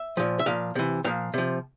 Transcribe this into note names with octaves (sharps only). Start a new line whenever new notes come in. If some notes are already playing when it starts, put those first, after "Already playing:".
Already playing: E5
A#2 F3
E5
A#2 F3 F5
C3 E3
A#2 F3 F5
C3 F3